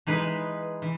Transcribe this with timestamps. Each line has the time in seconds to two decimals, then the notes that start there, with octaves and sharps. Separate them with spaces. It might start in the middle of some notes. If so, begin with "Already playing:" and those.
0.07 E3 G#3 D#4 G#4 B4
0.82 E3